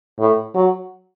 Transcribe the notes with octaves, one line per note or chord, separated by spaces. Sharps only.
A2
F#3